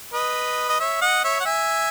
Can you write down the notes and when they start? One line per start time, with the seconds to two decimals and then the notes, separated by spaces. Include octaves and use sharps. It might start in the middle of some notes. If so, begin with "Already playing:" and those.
0.13 B4 D#5
0.69 D#5
0.80 C#5 E5
1.01 D#5 F#5
1.24 C#5 E5
1.40 F#5
1.45 E5 G#5